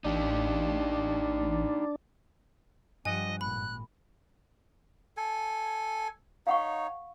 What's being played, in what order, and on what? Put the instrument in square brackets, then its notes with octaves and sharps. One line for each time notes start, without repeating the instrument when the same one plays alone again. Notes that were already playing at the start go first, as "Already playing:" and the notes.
[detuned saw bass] A1 [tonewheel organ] D4 [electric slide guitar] D#4 G4
[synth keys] G2 F#5 [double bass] F3 G3 [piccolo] D#5 [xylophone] G#5
[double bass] G#1 A#2 [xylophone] B5 [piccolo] F#6
[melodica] A4 G#5
[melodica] D#4 C#5 [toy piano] F5 F#5 C#6